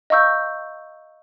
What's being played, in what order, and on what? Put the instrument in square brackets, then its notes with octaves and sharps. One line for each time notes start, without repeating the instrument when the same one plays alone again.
[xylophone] D#5 F5 A#5 C#6 E6 G6